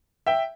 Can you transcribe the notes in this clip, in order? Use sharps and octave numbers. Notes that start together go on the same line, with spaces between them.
E5 G5